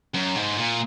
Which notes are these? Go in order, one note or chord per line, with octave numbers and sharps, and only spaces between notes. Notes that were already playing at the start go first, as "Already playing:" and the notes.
F#2
G#2
A#2